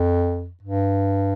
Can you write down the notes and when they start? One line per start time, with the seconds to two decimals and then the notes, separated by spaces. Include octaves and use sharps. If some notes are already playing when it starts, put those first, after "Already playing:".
Already playing: F2
0.62 G2